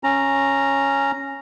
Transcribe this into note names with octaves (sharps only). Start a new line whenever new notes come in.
C#4 A#5